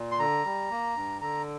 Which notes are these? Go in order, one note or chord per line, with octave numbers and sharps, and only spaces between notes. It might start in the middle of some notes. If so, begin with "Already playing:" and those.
Already playing: A#2
C6
D3 A#5
G3
A#3
G2
D3 A#5